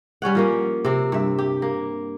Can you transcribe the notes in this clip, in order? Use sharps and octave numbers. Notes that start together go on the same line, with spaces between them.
G3 C#4 C#5 F#5
F3 A#3 C#4
C3 C4
G2 E5
G4
A#3